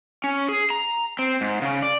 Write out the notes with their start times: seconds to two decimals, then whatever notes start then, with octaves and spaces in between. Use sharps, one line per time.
0.24 C#4
0.49 G#4
0.70 A#5
1.19 C4
1.41 G#2
1.62 C#3
1.82 D5